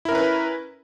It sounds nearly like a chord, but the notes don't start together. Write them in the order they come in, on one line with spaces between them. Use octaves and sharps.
E4 A#4 C#4 B4